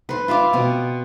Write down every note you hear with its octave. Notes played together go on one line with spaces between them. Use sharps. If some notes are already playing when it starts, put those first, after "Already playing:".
B4 C5
F4 E5 F5 D6
B2 C4